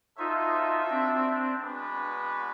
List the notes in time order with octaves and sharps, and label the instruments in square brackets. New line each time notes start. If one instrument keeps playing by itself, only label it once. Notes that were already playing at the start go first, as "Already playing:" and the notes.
[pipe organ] D#4 F4 [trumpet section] F#4 A4 C5 E5
[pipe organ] C4 D4
[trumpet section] G#3 B3 D4 F#4 B4